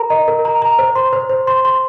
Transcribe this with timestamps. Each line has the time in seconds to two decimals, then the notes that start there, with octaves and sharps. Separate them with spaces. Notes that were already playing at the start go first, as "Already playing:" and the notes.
Already playing: A#4 A#5
0.10 D#5
0.28 A#4
0.45 A#5
0.62 A#5
0.79 C5
0.95 C6
1.13 C5
1.29 C5
1.47 C6
1.65 C6